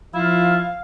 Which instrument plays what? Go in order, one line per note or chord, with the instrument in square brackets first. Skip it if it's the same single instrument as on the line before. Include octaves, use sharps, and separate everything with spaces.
[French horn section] F3 [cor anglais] E4 [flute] F4 [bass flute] F5